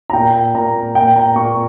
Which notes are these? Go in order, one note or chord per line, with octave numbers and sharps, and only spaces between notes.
A#5
A#2 A#3 G5
A#2 A#3 A#5
A#2 A#3 G5
A#5
A#2 A#3 C#6